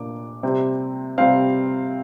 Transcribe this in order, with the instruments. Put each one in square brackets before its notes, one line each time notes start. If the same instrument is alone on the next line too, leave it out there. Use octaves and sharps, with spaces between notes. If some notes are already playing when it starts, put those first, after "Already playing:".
Already playing: [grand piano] A#2 A#3 D4 D6
C3 G3 C4
C3 G3 C4 F5